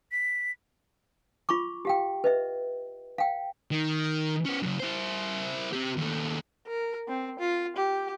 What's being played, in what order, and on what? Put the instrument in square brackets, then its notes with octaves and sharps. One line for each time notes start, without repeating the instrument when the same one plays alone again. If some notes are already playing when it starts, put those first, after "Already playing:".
[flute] B6
[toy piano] F4 B5 C#6 D6
G4 F5 G5
B4 D#5 E5
F5 G5
[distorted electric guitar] D#3
B3 C#4
F#2 C#3
E4 C5
C4 G4
D#2 A3
[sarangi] A#4
C4
F4
G4